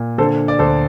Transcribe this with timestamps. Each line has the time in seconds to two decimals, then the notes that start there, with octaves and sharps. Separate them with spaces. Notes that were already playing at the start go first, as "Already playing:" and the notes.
Already playing: A#2
0.18 D3 A4 C5
0.48 D5
0.59 D2 A4 C5